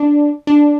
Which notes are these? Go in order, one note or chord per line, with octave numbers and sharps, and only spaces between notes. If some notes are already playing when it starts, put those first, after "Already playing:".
Already playing: D4
D4